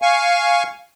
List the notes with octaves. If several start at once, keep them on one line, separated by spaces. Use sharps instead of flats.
F5 G#5 C#6